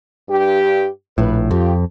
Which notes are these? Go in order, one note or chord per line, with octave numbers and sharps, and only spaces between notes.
G2 G4
A#1 A2 B4
F2 F4 G4